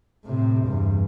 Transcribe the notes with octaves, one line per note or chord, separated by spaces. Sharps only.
A2 C3
E2 G2